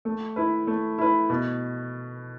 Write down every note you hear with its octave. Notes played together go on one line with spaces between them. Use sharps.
A3
E4 B4
A3
E4 B4
B2